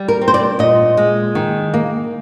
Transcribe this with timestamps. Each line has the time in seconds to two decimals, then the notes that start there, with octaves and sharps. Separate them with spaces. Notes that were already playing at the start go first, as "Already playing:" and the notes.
Already playing: G3
0.08 A#4
0.21 C4
0.28 C5
0.34 D5
0.59 A#2 D#5
0.97 G#3
1.35 D#3
1.74 A#3